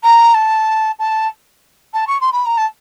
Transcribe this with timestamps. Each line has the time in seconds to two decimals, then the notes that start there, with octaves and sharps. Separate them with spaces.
0.03 A#5
0.34 A5
0.99 A5
1.93 A5
2.07 C#6
2.20 C6
2.32 B5
2.45 A#5
2.57 A5